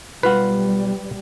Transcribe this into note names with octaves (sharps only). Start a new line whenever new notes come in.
B1 G3 F4 B4 F#5